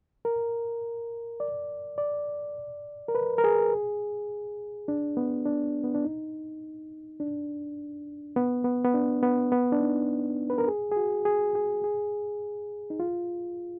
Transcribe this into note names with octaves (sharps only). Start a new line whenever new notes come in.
A#4
D5
D5
A#4
B4
A#4
G#4
D4
B3
D4
B3
D4
D#4
D4
B3
B3
B3
D4
B3
B3
D4
D#4
B4
A#4
G#4
G#4
F#4
G#4
G#4
G#4
D#4
F4